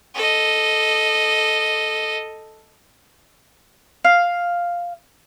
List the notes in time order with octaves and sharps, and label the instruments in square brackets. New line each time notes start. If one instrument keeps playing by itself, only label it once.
[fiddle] A4 D#5
[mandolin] F5